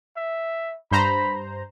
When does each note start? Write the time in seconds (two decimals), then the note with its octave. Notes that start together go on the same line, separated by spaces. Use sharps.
0.17 E5
0.92 G2 C5 A#5 B5